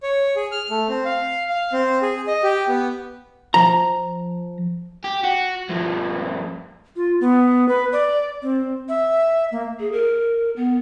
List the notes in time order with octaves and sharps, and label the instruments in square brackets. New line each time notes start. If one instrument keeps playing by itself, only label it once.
[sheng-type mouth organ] C#5
G#4
F6
A3
C4
F5
F5
C4
G#4
D#5
G4
B3
[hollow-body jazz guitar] F3 A#5
[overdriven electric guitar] G4
F#4
G2 F3
[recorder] F4
B3
B4
D5
C4
E5
A#3
[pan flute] G#4
A#4
B3